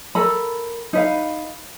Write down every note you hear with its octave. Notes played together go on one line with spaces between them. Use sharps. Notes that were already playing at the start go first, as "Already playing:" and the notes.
A4 A#4 B5
D#4 B4 F5